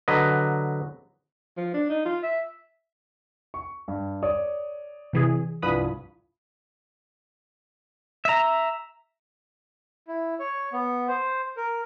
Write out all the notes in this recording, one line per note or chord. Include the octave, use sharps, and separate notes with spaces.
D3 F#3 B4 D#5
F3
D4
D#4
F4
E5
C#6
G2
C#5 D5 D#6
C3 E3 G#4
C2 G2 F3 B4 B5 D#6
E5 A#5
E4
C#5
B3
C5
A#4